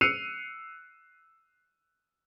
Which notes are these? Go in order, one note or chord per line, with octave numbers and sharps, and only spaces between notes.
E6 F#6 C7 C#7 D#7 F7